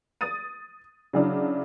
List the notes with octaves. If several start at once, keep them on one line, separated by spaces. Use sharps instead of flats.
D#6 A6 D#7
C#3 F#3 D4 E4